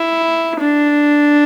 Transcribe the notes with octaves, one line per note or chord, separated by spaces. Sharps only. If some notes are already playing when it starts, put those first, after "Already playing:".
Already playing: E4
D4